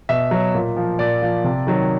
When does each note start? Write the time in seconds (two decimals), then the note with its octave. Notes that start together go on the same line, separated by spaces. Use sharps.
0.09 B2 E5
0.31 F#3
0.55 A#2
0.77 F3
0.99 A#2 D5
1.22 F3
1.44 C3
1.67 D#3 F#3